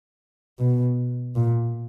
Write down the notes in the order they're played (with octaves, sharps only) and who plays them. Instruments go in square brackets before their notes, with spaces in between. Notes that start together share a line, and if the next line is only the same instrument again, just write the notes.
[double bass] B2
A#2